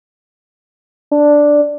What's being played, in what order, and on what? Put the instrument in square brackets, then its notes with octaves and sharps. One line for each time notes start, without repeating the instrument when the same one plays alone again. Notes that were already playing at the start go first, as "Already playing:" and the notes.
[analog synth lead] D4